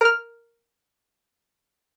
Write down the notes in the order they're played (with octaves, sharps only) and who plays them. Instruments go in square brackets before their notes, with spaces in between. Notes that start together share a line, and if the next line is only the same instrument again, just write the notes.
[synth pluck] A#4 F6